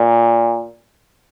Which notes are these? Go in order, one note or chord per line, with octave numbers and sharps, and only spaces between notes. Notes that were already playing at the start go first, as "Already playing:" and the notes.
Already playing: A#2